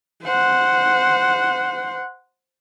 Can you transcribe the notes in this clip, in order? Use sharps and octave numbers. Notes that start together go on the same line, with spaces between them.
C5 F#5